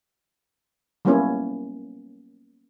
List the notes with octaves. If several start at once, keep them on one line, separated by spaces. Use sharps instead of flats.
F#3 G3 A#3 B3 C#4 E4